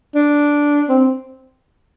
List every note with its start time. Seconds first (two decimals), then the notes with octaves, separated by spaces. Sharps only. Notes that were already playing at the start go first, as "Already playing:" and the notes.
0.15 D4
0.89 C4